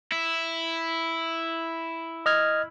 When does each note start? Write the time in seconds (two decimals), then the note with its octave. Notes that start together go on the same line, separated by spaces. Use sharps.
0.12 E4
2.26 D#5 F6 G#6